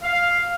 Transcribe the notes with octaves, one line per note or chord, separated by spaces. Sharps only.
F5